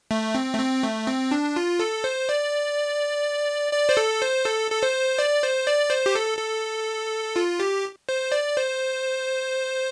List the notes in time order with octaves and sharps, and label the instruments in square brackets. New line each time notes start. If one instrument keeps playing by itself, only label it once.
[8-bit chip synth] A3
C4
A3
C4
A3
C4
D4
F4
A4
C5
D5
D5
C5
A4
C5
A4
A4
C5
D5
C5
D5
C5
G4
A4
A4
F4
G4
C5
D5
C5